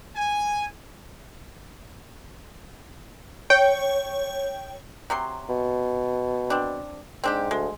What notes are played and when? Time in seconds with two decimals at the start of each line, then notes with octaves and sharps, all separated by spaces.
0.16 G#5
3.50 C#5 G5
5.10 C3 F#3 C6
5.49 B2
6.50 C4 D4
7.24 G#2 C4 D4 G4
7.51 D2 G#3